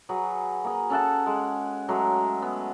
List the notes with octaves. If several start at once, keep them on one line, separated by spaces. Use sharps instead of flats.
F#3 F#4 G#4 B4
A#3 G#4
C#4 A4 F#5 A5
G#3
F#3 G#3 A3
B3